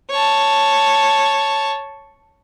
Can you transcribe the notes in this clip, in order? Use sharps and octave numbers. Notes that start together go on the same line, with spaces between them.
C#5 A5